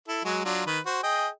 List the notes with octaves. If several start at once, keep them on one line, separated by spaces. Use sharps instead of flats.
E4 A4
F#3 G#3 F#4
F#3 D4 F4
D#3 B4
F#4 C5
G#4 D#5 G5